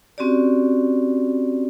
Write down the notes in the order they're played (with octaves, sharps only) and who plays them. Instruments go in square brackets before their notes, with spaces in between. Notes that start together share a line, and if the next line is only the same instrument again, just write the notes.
[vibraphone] C4 C#4 F#4 G4 D5